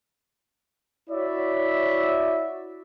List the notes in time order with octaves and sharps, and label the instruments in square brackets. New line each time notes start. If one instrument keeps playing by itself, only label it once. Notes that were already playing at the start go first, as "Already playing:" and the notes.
[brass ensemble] E4 F#4 C#5 D5 E5